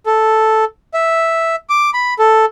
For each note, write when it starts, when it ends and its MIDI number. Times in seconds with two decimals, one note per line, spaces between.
0.06 0.65 69
0.94 1.56 76
1.70 1.90 86
1.94 2.14 83
2.19 2.45 69